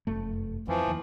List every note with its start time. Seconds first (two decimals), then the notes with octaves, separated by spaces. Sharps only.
0.07 F1 F#2 A3
0.68 F2 E3 F3
0.88 D#2